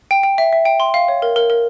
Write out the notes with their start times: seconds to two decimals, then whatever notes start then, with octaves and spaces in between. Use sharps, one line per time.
0.11 G5
0.23 G5
0.38 E5
0.53 E5
0.65 G5
0.80 C6
0.94 F5
1.08 C#5
1.22 A#4
1.36 A#4
1.50 A#4